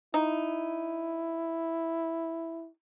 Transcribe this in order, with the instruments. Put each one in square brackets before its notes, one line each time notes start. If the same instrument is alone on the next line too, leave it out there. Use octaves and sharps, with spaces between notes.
[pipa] D#4 [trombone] E4